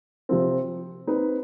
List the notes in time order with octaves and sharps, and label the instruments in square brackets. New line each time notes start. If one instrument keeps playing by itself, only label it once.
[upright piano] C3 F3 C4
C4 D#4 B4